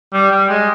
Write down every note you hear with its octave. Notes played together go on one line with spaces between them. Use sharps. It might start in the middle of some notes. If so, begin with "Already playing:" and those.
G3
G3
G#3